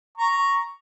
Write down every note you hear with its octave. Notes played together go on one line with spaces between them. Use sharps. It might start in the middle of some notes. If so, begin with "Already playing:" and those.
A#5 C#6